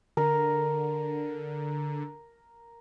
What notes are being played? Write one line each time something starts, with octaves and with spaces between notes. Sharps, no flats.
D3 A#4